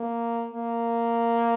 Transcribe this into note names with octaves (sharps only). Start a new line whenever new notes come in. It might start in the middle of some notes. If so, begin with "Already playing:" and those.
Already playing: A#3
A#3